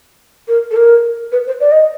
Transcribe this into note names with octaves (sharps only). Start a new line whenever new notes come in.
A#4
A4
A#4
B4
C5
D5
D#5